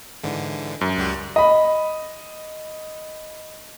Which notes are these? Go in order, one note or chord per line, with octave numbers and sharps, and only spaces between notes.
G#2 D3 E3
F#2
C#2 G3 F#4
D#5 B5